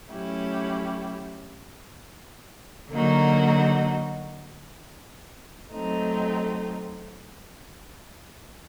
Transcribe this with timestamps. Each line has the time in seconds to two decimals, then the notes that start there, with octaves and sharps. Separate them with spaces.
0.10 F#3 A3 C#4 E4 G4
2.91 D3 F#3 A#3 D#4 F#4
5.72 F#3 A3 C4 D#4